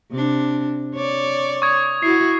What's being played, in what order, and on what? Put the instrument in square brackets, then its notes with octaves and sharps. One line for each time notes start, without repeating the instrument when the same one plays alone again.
[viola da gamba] C3 D4
C#5 D5
[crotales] C#6 D#6 G#6
[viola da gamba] E4 F#4 [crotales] C7